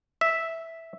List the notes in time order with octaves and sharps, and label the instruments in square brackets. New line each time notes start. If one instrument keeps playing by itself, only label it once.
[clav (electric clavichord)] E5